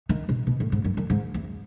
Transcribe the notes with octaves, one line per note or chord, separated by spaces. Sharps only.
D#3
B2
B2
A2
G#2
F#2
F#2
G#2
E2